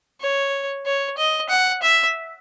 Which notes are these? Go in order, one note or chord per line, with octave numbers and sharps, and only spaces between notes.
C#5
C#5
D#5
F#5
E5